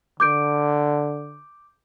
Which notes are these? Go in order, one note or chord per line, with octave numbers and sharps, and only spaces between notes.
D3 D6 G6 D7